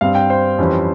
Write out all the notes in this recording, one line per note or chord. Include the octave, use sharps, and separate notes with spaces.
G2 G3 C4 F5
G5
C5
F2 E3 G3 C#4